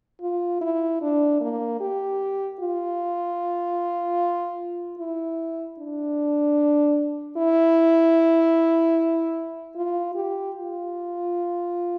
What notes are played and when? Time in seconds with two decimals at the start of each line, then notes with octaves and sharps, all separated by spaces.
0.21 F4
0.61 E4
1.02 D4
1.41 A#3
1.80 G4
2.60 F4
4.99 E4
5.79 D4
7.37 E4
9.76 F4
10.15 G4
10.56 F4